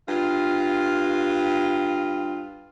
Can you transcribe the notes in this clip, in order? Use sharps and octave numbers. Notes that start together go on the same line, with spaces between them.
G2 F4